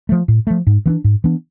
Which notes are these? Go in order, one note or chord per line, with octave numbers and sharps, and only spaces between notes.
F3 A3
A2
F3 A3
G#2
E3 B3 D4
G#2
E3 B3 D4